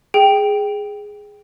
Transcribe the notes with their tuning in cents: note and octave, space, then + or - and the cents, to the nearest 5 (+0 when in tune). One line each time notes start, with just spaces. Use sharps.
G#4 +0 G5 +0